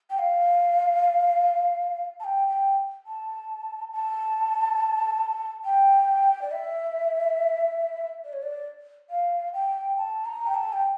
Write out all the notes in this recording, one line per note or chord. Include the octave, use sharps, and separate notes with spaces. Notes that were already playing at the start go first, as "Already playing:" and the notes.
G5
F5
A5
G5
G5
A5
A5
G5
D5
E5
D5
C#5
D5
F5
G5
A5
A#5
G5
A5
G5